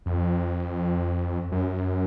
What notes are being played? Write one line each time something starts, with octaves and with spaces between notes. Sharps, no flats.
F2
F#2